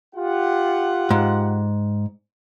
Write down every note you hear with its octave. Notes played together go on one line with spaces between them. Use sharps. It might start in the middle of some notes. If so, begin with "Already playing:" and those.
F4 G4 F#5
G#2